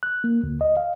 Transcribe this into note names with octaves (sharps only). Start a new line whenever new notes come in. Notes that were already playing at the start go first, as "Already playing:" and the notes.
F#6
A#3
D2
D#5
F5